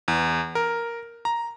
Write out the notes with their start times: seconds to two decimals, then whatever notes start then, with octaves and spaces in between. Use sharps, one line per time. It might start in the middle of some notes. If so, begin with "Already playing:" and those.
0.08 E2
0.55 A#4
1.25 A#5